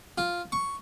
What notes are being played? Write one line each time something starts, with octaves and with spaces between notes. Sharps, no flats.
F4
C#6